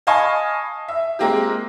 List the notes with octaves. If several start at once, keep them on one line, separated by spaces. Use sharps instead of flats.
D#5 F5 G#5 A5 B5 C#6
E5
G#3 A#3 C4 F4 G4